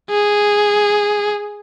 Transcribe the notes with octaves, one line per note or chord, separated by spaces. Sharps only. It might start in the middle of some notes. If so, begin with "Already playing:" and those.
G#4